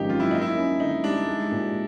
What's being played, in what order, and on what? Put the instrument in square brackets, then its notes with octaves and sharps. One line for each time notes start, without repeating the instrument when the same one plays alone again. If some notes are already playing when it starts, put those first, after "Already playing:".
Already playing: [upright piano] G#1 C#3 F3 [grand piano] D#4 G4
[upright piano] F#2 [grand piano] F4
[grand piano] E4
[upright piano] A#3 [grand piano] D#4
[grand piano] E4
[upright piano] C#4
[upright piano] D3 [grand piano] D#4
[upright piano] G3 [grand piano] D4
[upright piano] G#3
A#2